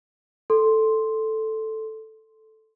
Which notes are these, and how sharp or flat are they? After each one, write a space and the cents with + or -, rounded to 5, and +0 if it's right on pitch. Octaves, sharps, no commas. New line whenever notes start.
A4 +0 C6 +0